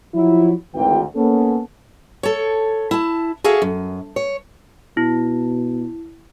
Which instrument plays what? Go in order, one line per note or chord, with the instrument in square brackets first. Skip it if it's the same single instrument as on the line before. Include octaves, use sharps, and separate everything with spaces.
[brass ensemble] F3 F#3 E4
G#1 D2 E3 G5
A#3 B3 C#4 A4
[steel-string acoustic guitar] A4 C#5
E4 A5
F#4 G#4 A4 E5 F5
F#2
C#5
[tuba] B2 [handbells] E4